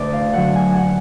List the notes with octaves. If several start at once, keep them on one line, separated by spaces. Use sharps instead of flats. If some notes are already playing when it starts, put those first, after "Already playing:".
Already playing: D2 D3 B4 D5
F5
D3 F#3 F#5
G#5
F#5